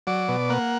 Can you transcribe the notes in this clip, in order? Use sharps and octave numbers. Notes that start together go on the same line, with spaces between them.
F#3 D5
B2
A#3 F#5